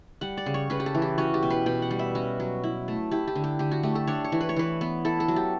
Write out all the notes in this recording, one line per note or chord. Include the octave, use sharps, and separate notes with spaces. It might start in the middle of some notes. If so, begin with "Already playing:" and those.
G3 F#5
D5
C#3
C#5
C#3 B4
G4
A4
E3
G4
C#4 F#4
G4
B2
B4
B2 G5
F#5
G3
E5
C#4 F#4
F#3
E4
A3
E4 G4
G4
D3
G4
D3 G4
F#4
A3 G4
A4
D4 C#5
C#5
E3
B4
C#5
E3 B4
B3
E4 A4
A4
F#3
G4